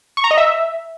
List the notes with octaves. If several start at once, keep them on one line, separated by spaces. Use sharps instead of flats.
C#6
A#5
D#5
E5